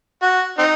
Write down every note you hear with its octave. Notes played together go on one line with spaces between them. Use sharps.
F#4
C4 D#4